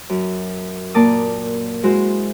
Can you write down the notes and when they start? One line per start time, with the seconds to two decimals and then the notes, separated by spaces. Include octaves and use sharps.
0.10 F#2
0.94 A#2 A#3 A#4 A5 D6 D#6
1.83 G#3 E4 F#4 C5